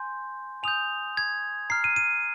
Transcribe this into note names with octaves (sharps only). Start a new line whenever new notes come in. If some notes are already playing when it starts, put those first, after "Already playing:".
Already playing: G#5 C6 G6
G#5 D#6 G6 F7
G#6
A#5 F6 C7
D#7
D#7